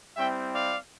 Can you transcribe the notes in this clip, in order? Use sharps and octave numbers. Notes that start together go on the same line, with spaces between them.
G3 C4 E4 E5 G5
D5 F5